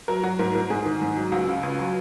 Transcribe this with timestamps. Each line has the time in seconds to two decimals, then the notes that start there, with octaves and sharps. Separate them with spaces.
0.08 F#3 A#4
0.23 F#3 F#4
0.39 G#2 A#4
0.55 G#2 A#4
0.70 G#2 G#4
0.86 D#3
1.01 G#2
1.17 F#3
1.32 C#2 F#4
1.48 C#3
1.63 C#2
1.79 F#3